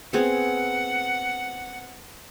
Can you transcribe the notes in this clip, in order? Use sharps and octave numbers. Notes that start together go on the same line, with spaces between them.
B3 C4 G#4 F#5